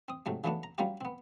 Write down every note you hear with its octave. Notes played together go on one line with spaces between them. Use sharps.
C4 D#6
G#2 C3 F#3 A3
C#3 E3 F#3 A3 B3 D4
A#5
F#3 G3 A#3 C#4 F4 G4
B3 C4